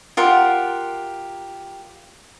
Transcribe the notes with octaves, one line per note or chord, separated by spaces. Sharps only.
F4 G4 A#4 F#5